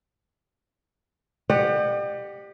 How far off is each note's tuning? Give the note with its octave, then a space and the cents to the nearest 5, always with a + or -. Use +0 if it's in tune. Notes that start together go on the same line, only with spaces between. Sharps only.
G4 +10 D5 +45 F#5 +0